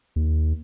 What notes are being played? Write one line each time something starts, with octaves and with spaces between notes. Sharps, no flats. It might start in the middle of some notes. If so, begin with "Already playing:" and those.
D#2